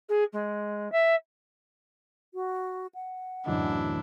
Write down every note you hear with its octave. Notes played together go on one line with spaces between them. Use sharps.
G#4
G#3
E5
F#4
F#5
D1 F#2 D3 E3 A3 D4 E4 D#5